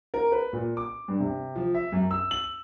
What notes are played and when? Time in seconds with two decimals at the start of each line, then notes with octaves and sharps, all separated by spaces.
0.14 A#4
0.32 B4
0.53 A#2
0.77 D6
1.08 G2
1.20 C3
1.56 F3
1.74 E5
1.92 F#2
2.11 E6
2.31 F#7